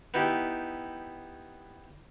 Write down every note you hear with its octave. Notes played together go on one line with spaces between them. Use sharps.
B3 D#4 E4 G4